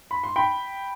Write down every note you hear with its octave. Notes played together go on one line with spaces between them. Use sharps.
B5
C6
G5 B5